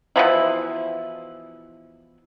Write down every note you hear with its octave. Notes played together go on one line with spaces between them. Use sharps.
B2 E3 F3 E4